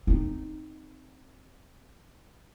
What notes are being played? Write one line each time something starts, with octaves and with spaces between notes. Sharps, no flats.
C4 D#4